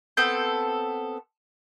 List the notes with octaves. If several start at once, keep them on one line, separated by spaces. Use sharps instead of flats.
B3 C4 A4 G6